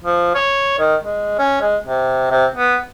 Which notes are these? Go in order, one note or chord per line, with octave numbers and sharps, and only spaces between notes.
F3
C#5
D#3
G#3
C#4
G#3
C3
C3
B3